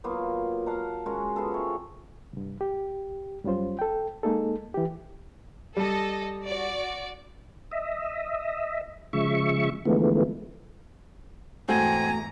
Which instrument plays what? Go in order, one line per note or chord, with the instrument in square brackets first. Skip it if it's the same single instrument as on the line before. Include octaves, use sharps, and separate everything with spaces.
[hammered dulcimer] F#3 A#3 B3 F4
F5 F#5 A5 A#5
G#3 C#4 F#4 A#4
B3 F4 G#4 A4
C3 C#5
[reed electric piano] C2 G2
G4
F#2 G3 C#4 F4 C5
A4 G5
G#3 A#3 D#4 G#4 A4
E3 G4
[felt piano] G3 [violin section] A4 D#5
[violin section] F#4 D5
[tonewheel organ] D#5 E5
C#3 F3 G#3 E5 C#6
D3 E3 F3 G#3 A3 B3
[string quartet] E2 G#2 A#5 [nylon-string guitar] A3 F#4 [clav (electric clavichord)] C4 [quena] G#5